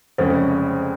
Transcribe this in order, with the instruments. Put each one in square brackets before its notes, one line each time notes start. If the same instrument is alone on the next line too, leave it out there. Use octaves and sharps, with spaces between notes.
[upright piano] F1 F2 C#3 G#3 C#4 [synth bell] C5